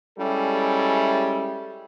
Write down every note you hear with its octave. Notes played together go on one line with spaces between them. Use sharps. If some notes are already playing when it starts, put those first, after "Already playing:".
G3 G#3 C#4 E4 G4 A4